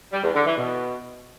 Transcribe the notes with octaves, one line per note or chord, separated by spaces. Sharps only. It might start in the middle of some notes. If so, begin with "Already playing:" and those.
G3
E2
D3
E3
B2